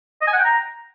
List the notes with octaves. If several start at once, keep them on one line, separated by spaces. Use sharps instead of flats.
D#5
G#5
F#5
G5
A#5